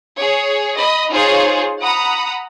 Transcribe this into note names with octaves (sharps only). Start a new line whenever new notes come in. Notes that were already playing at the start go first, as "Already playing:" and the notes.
G#4 C#5
D#5 B5
D#4 F4 G#4 C5 C#5
F#5 A#5 B5 D#6